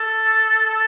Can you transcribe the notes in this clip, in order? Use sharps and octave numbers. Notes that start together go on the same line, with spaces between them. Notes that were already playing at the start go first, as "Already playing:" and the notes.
Already playing: A4
A4